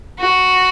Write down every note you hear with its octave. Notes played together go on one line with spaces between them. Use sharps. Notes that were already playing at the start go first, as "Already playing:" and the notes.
F#4